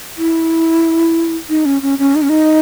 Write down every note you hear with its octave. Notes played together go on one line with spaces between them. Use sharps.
E4
D#4
C#4
C#4
C#4
D#4
C#4
D#4